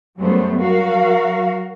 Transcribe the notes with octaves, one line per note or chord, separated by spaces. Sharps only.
F#2 F#3 G3 A3 B3 C5
F#3 F#4 A#4 F5